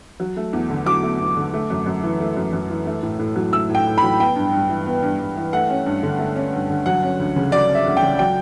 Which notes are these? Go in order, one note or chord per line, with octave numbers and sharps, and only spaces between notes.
F#3
A3
E2
D3
F#3 D6
A3
E2
D3
A3
F#2
F#2
E3
A3
F#2
F#2
E3
A3
A2
A2
F#3
A3 E6
A2
G5
A2
B5
F#3
B3 G5
G2
G2
E3
B3
G2
G2
E3
A3 F#5
C#4
G2
D3
A3
C#4
G2
D3
F#3 F#5
C#4
D2
C#3
F#3 D5
C#4
E5
D2
G5
C#3
F#3 G5